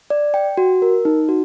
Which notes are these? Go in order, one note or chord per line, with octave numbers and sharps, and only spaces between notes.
D5
G5
F#4
A#4
D#4
F#4